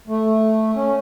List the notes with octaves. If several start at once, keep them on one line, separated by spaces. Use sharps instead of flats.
A3
C#4